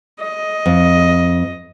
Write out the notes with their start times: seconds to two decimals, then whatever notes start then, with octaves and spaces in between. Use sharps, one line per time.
0.20 D#5
0.66 F2